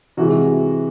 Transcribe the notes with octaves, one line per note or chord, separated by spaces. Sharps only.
C3 E3 G#3 F#4